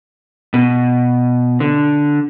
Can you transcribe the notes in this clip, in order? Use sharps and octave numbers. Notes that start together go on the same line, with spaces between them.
B2
D3